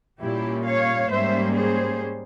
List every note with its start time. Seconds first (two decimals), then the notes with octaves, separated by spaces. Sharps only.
0.19 A#2 G3 A#3 C#4 E4 G4
0.64 C#5 F5
1.09 G#2 G3 A#3 C#4 C5 E5
1.55 G#4 C5